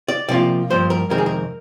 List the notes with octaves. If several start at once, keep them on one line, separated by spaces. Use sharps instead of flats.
D5
C3 F3 A#3 F4 D5
G2 F3 A#3 C5
A#4
F2 C3 D#3 G#3 C4 A#4
G#4
A#4